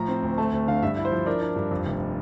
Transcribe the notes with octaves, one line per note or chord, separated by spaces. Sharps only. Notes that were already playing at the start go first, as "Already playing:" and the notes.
Already playing: A2 F3 A#5
C4
D2
A3 A5
D2
D3 F5
G2 E5
E4
C5
F3
D4 A#4
D4
G2
F2
F1